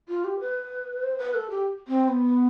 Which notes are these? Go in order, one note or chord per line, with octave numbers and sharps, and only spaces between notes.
F4
G4
B4
C5
B4
A4
G4
C4
B3